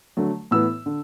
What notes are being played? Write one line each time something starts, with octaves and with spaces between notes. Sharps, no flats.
D3 F#3 A3
A2 E3 B3 E6
D3